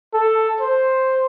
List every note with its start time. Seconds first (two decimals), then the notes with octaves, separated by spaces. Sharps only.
0.14 A4
0.61 C5